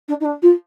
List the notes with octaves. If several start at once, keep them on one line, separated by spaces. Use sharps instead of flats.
D4
D#4
D4
F4